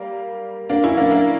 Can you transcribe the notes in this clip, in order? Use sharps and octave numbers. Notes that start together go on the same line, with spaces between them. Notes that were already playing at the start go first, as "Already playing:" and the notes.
Already playing: G3 A#3
A#3 D4
C#4 E4
A#3 D4
A#3 D4